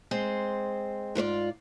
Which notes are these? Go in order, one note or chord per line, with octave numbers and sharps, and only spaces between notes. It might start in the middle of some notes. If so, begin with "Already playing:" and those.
G#3 C4 C5
G#2 F4 C5 D5